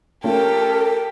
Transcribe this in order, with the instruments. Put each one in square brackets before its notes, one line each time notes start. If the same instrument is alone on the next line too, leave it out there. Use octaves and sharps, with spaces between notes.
[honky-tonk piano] A3 C#4 F4 [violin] G4 [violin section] A4 [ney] A#4